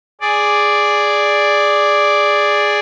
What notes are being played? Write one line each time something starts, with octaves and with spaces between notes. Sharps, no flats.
G#4 D5